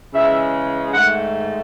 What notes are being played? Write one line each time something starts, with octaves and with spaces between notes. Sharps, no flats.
C#3 E3 G#3 E5
G#2 D#3 A3 F#5